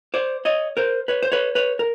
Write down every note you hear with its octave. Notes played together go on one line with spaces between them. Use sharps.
C5 D5
C#5 D#5
A#4 C5
B4 C#5
C5
B4 C#5
B4 C#5
A#4